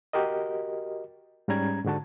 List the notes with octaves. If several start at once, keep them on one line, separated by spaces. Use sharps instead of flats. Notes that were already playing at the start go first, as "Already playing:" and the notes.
F#4 G4 A#4 D#5
G#2 G3 C#4 A#5 G#6
G#2 D3 F#4 A5